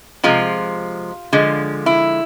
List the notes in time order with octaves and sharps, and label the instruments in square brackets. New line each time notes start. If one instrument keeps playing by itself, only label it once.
[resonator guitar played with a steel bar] C3 F3 G#3 F4
D3 F3 G#3
E4